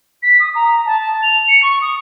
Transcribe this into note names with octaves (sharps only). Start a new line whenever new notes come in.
B6
D#6
A#5
A5
F7
C#7
C#6
D#6